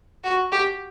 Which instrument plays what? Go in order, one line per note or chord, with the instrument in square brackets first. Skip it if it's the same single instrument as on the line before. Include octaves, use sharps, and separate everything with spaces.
[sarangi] F#4
G4